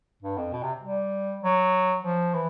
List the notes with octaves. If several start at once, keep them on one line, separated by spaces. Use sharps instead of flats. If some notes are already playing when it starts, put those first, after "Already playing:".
G2
F2
B2
C3
G3
F#3
F3
E3